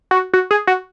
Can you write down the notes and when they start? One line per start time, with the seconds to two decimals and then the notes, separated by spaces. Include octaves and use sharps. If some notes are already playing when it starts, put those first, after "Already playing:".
0.11 F#4
0.34 F#4
0.51 G#4
0.67 F#4